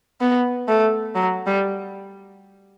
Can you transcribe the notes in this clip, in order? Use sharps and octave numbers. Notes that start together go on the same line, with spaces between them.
B3
A3
F#3
G3